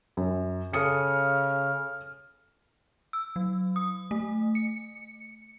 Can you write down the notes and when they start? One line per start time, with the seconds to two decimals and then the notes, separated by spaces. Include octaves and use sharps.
0.17 F#2
0.74 C#3 A4 D#6 F6 C#7
3.13 E6
3.36 F#3
3.76 D#6
4.11 A3
4.55 C#7